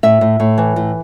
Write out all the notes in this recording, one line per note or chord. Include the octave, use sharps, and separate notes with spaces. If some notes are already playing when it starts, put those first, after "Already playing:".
A2 E5
A2
A2
E3
A2